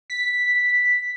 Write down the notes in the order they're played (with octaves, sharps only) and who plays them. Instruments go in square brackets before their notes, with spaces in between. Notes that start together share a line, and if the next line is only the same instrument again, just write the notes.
[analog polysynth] B6